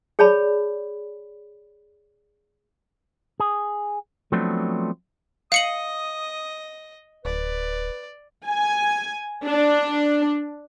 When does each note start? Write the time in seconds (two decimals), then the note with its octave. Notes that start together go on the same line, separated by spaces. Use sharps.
0.19 G#4 C#5 D5 A5 B5
3.40 G#4
4.32 F3 F#3 A3 B3 C4 D4
5.52 D#5 F5 D#6 C#7 F#7
7.25 D1 B4 D5
8.45 G#5
9.45 D4